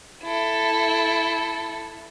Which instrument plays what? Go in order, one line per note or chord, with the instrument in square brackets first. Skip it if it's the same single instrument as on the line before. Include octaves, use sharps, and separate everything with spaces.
[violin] E4 A4